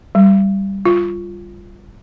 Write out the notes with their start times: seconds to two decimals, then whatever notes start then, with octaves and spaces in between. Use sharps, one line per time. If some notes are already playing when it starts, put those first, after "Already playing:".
0.15 G3
0.85 F4